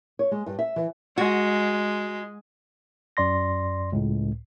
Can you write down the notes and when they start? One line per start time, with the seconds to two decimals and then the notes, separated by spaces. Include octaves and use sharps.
0.19 C#5
0.31 G#3
0.46 G2
0.59 E5
0.76 E3
1.18 G#3 F#4
3.17 F#2 D5 C6 A#6
3.92 C#2 A2